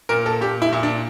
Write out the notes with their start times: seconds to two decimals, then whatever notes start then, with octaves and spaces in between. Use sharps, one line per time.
0.09 A#2 A#4
0.26 A4
0.41 A#2 G4
0.62 E4
0.73 A#2
0.83 D4